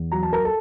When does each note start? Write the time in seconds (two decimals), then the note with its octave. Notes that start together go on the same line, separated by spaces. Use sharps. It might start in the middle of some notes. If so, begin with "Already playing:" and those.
Already playing: E2
0.12 F#3 A#5
0.23 A5
0.33 A#4 A#5
0.45 A4 A5